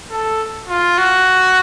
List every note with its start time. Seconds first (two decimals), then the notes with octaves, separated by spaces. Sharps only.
0.11 A4
0.69 F4
0.98 F#4